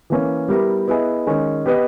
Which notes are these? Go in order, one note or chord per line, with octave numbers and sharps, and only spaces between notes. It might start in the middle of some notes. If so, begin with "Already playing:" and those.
E3 A#3 C#4
G3 B3 E4 G4 A#4
B3 E4 G#4 D#5
D#3 G#3 C#4
B3 G4 B4 D#5